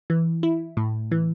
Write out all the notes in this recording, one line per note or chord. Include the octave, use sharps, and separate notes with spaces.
E3
E4
A2
E3